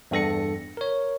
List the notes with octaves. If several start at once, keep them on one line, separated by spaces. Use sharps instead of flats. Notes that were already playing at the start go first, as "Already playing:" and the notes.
E2 G2 A4 A#6 C#7
A#4 C#5